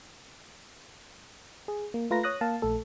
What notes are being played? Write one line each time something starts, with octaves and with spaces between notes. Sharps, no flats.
G#4
A#3
A3 F4 B4 A#5 A#6
C#5 D#6 F#6 A#6
A#3 F5 A5
A#1 A3 A4